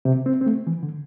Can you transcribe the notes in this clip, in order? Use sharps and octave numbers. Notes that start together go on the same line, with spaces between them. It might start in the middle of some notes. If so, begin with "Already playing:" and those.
C3
C4
C4
A3
E3
D3